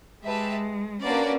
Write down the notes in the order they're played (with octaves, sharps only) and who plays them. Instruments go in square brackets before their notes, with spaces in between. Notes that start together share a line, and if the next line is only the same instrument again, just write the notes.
[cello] G#3 [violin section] G4 B4 E5 A5
[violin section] A#3 D4 F#4 B4 D5 [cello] C#4